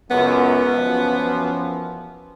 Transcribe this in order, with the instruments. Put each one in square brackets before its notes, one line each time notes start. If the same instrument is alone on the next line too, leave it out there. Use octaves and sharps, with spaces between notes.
[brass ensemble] C#2 F#2 [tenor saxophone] B3
[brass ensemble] F#2 E3 F3